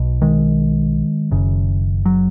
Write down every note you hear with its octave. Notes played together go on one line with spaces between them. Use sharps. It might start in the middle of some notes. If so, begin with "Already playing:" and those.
Already playing: B1 B2
D#3 G#3
F#1 F#2 C#3
F#3